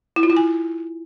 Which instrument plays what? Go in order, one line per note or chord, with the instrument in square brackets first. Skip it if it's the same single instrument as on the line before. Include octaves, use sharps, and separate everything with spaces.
[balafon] E4
F4
E4
G#5